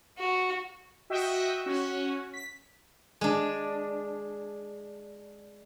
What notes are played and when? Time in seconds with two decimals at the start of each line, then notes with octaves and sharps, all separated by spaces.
0.17 F#4
1.10 F#4 D#5 E5 G5
1.66 C#4 F#4
2.34 B6
3.21 G#3 D4